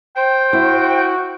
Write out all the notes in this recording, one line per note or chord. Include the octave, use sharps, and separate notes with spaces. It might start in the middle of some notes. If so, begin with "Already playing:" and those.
C5 G5
E4 F#4